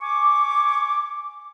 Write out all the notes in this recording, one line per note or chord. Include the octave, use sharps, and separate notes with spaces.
G#5 C#6 D6